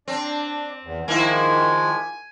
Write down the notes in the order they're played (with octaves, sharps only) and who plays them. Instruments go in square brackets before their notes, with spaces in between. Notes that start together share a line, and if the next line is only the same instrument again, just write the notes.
[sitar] C4 [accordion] D4
[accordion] E2
[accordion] D#3 F3 G#3 [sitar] A#3 E4 [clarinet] G#5